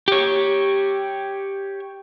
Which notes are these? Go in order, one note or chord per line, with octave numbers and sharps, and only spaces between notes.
G4 C#5